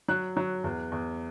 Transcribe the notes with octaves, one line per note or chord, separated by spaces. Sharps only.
F#3 F#6
F#3
E2
E2